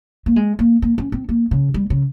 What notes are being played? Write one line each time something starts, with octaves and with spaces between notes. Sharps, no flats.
A#3
G#3
A#3
A#3
C#4
C4
A#3
C#3
G3
C#3